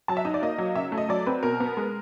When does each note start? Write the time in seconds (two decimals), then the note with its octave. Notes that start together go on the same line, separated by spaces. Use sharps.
0.08 F#3 A5
0.17 E5
0.25 D#4 D#5
0.34 D5
0.42 A#3 D#5
0.58 F#3
0.75 C#3 E5
0.92 A3
0.98 D#5
1.09 F#3 D5
1.26 C4 B4
1.43 B2 A#4
1.60 B3
1.77 G#3